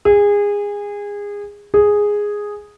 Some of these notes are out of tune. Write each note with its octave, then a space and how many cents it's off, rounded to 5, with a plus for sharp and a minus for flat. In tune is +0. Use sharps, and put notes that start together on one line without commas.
G#4 -25
G#4 -5